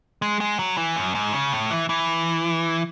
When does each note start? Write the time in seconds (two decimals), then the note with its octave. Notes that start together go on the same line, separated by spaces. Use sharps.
0.22 G#3
0.41 G#3
0.59 F#3
0.77 E3
0.96 F#2
1.15 G#2
1.33 C#3
1.52 A2
1.71 E3
1.89 E3